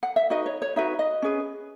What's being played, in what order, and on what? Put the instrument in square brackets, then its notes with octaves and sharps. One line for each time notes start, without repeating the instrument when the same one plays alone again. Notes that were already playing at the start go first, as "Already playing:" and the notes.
[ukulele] F#5
E5
D#4 F#4 B4 D#5
C#5
C#5
D#4 F#4 B4 E5
D#5
C#4 G#4 B4